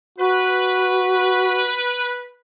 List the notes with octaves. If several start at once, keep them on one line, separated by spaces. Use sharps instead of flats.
F#4 B4